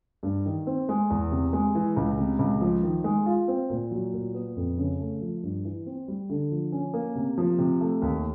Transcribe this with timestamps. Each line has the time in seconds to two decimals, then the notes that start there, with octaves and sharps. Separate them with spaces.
0.23 G2
0.46 D#3
0.67 C4
0.89 G#3
1.10 E2
1.31 C3
1.53 G#3
1.75 E3
1.96 C#2
2.19 C3
2.39 C#2
2.61 F3
2.83 D#3
3.04 G#3
3.26 F4
3.48 C4
3.70 A#2
3.91 F#3
4.13 A#2
4.34 B3
4.56 F2
4.78 C#3
5.00 A3
5.21 F3
5.43 G2
5.65 E3
5.86 C4
6.08 G3
6.30 D3
6.51 F3
6.72 C#4
6.94 A#3
7.15 C3
7.38 F3
7.58 C3
7.81 A3
8.02 D#2